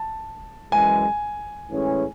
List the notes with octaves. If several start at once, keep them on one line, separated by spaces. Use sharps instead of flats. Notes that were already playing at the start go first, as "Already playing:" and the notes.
Already playing: A5
F#2 E3 G#3 G#5
A2 E3 G#3 C#4 G#4